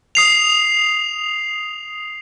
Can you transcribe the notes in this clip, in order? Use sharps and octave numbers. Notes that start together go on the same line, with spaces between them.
D#6 C7 F7